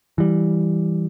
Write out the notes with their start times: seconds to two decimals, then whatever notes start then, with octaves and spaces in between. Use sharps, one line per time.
0.18 E3 G3